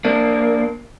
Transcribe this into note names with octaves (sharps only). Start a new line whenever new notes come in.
A#3 D4